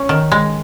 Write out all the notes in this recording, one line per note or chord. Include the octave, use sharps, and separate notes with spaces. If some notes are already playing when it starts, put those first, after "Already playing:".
Already playing: C#4
D#3
G#3